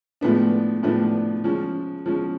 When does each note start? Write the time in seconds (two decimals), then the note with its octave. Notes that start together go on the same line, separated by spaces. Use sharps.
0.21 A2 F3 G#3 B3 D4
0.83 A2 F3 G#3 B3 D4
1.44 F3 G#3 C#4
2.06 F3 G#3 C#4